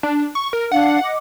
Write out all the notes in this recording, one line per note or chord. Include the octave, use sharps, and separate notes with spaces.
D4
C#6
A#4
D4 F5 F#5
D#5 D6